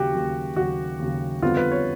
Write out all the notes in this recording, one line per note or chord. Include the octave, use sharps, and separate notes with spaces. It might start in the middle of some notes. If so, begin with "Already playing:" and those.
Already playing: D#2 C#3 F#3 F#4 G4
D#2 C#3 F#3
D#2 C#3 F#3 F#4
D#2 C#3 F#3
F2 D3 G3 B3 F4
B4
C#5